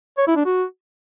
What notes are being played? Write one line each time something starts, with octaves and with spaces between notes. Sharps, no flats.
C#5
E4
D4
F#4